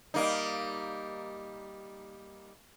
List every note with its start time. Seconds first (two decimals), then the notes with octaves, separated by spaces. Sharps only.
0.14 G3 A#3 D#4